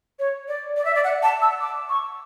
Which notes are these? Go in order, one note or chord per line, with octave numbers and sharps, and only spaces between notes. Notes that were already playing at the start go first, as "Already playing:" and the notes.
C#5
D5
D5
E5
D5
F#5
A5
E6
D6
C#6